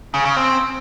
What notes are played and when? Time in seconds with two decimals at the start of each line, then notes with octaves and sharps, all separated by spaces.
0.14 C#3
0.25 C#3
0.37 C4